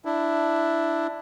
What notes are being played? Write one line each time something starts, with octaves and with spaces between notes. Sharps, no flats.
D4 E4